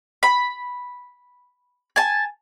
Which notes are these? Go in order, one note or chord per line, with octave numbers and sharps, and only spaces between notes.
B5
G#5 A5